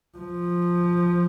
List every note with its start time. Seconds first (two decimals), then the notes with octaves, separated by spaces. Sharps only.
0.18 F3